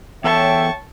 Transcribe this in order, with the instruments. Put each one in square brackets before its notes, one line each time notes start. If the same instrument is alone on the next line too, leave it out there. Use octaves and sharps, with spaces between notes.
[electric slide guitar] E2 A4 [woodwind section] C#5 E5 G5 [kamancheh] A5 C#6